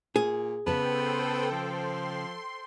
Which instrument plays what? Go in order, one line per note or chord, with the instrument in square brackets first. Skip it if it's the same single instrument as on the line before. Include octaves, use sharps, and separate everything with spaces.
[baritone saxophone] A#2 [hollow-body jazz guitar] G#4
[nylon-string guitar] C#3 B4 A5 [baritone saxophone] B3 [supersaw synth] A4 C5 G5
[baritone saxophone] F3 [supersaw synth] C6